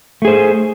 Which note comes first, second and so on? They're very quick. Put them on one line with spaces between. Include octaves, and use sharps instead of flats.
A3 G#4 C5